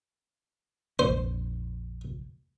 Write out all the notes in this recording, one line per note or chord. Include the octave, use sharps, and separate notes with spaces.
A#1 F2 A#3 C5